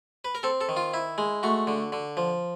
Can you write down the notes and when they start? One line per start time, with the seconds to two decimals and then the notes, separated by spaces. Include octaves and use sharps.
0.25 B4
0.35 A#4
0.43 C4 A4
0.61 A4
0.69 D#3
0.77 F4
0.94 E4
1.18 G#3
1.43 A3 F#4
1.67 D3
1.92 D3
2.17 F3